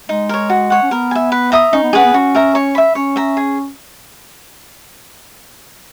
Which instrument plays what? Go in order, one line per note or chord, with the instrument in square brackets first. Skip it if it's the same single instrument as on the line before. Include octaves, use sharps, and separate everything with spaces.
[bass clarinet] G#3 [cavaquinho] D#4
[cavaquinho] A#4 C#5
F#4
C#5 F#5
[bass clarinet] C#4
[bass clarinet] B3 [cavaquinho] A#4
[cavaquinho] E5 G#5
B4
E5 A#5 D#6
[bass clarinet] C#4 [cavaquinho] D#4
[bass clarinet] B3
[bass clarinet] C#4 [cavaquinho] G#4 B4 F#5
[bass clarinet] B3
[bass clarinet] C#4 [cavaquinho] F#4
[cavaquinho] A#4 E5 A#5
C#5
E5 B5
[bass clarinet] C#4 [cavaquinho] C#5
[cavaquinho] E5 A#5
G#4